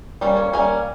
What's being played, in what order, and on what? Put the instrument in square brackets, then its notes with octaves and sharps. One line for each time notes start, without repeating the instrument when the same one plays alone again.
[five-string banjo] G3 A#3 C#4
C#5
G3 A#3 C#4 G#5